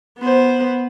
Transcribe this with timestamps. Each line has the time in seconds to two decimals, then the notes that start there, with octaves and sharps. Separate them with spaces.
0.18 B3 C5